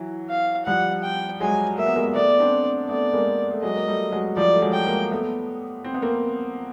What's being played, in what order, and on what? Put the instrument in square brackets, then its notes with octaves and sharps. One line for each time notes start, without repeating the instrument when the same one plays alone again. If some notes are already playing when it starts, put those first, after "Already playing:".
Already playing: [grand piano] E3 F#3
[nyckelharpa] F5
[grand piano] F3 G3 [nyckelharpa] F#5
[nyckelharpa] G5
[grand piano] F#3 G#3 [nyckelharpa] G#5
[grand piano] A#3 [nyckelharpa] E5
[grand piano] B3
G#3 A#3
[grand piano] A3 B3 [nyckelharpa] D5
[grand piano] C4 D4
[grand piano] A3 B3 [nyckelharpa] D5
[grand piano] G#3 A#3
A3
[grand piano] F#3 G#3 [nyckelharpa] D#5
[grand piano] A#3
G3 A3
F#3 G#3
[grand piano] F3 G3 [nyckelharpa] D5
[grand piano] A3
F#3 G#3
[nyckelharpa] G5
[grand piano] G#3 A#3
A3 B3
C4
B3
A#3 C4